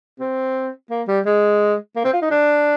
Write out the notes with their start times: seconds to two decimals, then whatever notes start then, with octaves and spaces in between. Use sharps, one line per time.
0.20 C4
0.90 A#3
1.08 G3
1.26 G#3
1.96 A#3
2.04 C4
2.13 F4
2.22 D#4
2.31 D4